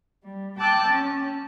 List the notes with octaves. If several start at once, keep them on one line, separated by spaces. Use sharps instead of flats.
G3
G5 A5 D6 E6 F#6 G6
C#4